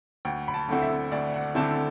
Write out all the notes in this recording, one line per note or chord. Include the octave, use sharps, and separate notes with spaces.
D2 G5
B5
A5
D3 A3 C4 E4 F#5
E5
D2 D5
F#5
D3 A3 C4 E4 A5